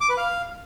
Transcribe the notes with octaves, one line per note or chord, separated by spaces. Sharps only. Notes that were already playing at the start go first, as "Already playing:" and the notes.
D6
B4
F5